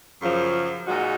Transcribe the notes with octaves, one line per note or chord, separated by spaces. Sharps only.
F#2 C#3 F3
A#2 G#3 D#4 F#4